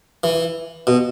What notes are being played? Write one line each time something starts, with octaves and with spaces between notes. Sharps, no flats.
E3
B2